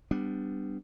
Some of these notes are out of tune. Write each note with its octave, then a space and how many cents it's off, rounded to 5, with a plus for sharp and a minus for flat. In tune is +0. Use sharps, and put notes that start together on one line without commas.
G3 +0 B3 +15 D4 +0